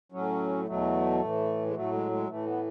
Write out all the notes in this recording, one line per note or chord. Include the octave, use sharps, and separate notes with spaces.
A2 F#3 C#4
E2 B2 F#3 A3
A2 E3
G#3
A2 F#3 A3
G#3
G#3
A2 E3 A3
B3